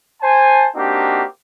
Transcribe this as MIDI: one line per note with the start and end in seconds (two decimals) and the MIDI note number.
0.22 0.65 72
0.22 0.65 80
0.22 0.65 81
0.76 1.23 58
0.76 1.23 60
0.76 1.23 62
0.76 1.23 63
0.76 1.23 66
0.76 1.23 67